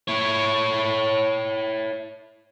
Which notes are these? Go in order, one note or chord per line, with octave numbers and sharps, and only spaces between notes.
E4 C#5